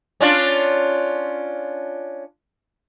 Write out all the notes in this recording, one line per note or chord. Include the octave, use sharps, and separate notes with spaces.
C#4 D4 F4